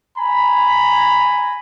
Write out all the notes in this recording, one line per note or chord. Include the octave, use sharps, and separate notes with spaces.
G#5 A#5 B5